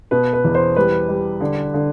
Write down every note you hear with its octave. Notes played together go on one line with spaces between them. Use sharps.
B2 B4
B4
E2
C5
G3 B4
G3
D3
D3